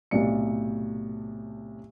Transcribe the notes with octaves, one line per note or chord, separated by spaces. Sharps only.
B1 A2 C3 D5 C#7